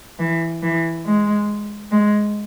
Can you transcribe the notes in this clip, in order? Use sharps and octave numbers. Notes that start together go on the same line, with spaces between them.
E3
E3
G#3
G#3